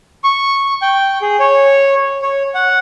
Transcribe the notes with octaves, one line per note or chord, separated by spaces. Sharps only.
C#6
G5
G#4
C#5
C#5
F#5